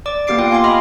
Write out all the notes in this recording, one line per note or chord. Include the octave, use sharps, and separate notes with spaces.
D5 D6
A#3 B3 G4 D6 C7 D7
F4 F5 G5
F5 G#5 C6 D6
D#5 F5 B5 D6 F6